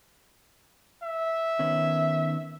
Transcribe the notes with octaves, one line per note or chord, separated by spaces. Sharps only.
E5
D#3 B3 C#4